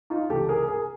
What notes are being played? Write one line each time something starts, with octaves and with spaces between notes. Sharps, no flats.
D#4 F4
C#2 C3 E3 G4 A4
G#4 A#4
G#4 A#4